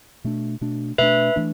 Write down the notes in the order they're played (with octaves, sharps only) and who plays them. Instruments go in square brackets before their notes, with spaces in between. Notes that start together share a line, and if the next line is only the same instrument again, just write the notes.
[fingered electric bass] B2 A3 D4
B2 A3 D4
[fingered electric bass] B2 A3 D4 [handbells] B4 E5
[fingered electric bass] E3 A3 D4